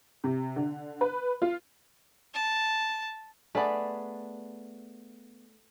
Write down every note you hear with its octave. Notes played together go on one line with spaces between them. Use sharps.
C3
D3
B4
F4
A5
A3 B3 D4 G#4 D5